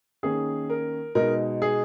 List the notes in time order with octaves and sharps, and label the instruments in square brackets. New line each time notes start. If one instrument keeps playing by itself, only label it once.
[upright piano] D#3 A#3 C#4 G#4
A#4
B2 G#3 D#4 A#4
G#4